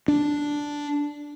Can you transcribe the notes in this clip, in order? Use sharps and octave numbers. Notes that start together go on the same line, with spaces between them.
D4